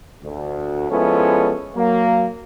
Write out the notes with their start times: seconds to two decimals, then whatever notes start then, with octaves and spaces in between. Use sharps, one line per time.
0.23 D2
0.90 F3 G#3 B3 C#4 E4 A4
1.75 F#3 A#3